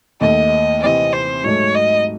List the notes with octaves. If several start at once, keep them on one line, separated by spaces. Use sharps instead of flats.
D#2 D#3 A3 D#5
C3 E3 C4 D#5
C5
G#2 F#3 A3 D#4 C#5
D#5